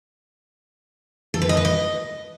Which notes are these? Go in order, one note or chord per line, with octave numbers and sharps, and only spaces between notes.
A4
B4
D#5
B4
D#5